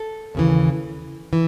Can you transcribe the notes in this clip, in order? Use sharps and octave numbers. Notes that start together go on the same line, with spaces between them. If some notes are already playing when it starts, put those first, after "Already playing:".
Already playing: A4
D#2 C#3 E3
E3